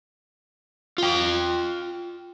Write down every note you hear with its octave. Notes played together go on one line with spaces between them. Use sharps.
F4 G5